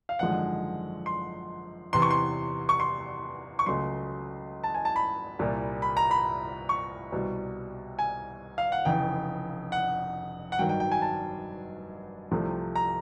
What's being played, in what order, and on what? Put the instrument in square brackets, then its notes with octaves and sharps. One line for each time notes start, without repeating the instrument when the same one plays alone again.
[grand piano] F5
G#1 F#2 D3 F3 G#3 F#5
C6
E2 C3 E3 C6
C#6
C6
C#6
C6
C#6
C#2 C#3 F#3 A3 C6
A5
G#5
A5
B5
C2 A#2 G3
B5
A#5
B5
C#6
C2 B2 G3
G#5
F5
F#5
F1 F2 C#3 E3 G5
F#5
F#5
G#1 G2 D#3 F#3 G5
G5
G5
G#5
A5
C2 C3 F3 A3
A#5